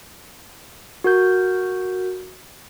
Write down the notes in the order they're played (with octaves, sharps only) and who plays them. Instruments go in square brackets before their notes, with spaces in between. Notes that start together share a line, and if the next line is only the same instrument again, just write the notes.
[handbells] F#4 A#4 G6